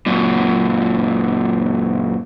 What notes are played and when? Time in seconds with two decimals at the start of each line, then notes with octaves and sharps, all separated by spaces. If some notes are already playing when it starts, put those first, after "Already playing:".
0.06 F#2 A#2